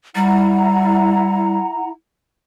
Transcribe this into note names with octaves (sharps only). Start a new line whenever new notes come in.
G3 E4 F#5 A#5